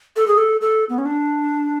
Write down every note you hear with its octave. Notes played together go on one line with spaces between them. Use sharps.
A4
G#4
A4
A4
B3
C#4
D4